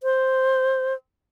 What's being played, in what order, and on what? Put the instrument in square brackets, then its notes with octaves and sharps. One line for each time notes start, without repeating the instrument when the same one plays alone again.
[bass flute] C5